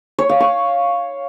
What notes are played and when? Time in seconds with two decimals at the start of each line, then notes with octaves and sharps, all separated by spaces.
0.18 C#5
0.29 F5
0.40 C#6